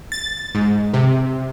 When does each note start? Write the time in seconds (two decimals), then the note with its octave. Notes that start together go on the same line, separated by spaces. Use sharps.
0.12 A6
0.55 G#2
0.94 C3